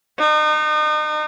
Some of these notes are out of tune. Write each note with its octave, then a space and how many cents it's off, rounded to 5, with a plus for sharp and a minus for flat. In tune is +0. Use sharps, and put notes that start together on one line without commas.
D#4 -35